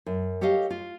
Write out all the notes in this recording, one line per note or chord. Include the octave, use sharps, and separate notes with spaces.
F#2
G4 A4 C#5 D#5 F5
F4